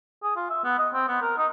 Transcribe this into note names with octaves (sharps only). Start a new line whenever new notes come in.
G#4
F4
E5
B3
D#5
C4
B3
A#4
D#4